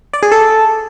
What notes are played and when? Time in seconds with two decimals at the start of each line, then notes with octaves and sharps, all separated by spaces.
0.13 D5
0.23 G#4
0.32 A4